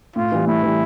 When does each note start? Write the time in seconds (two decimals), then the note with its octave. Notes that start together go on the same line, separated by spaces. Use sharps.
0.16 A2 F4
0.32 E3 G3
0.47 A2 E4
0.62 E3 G3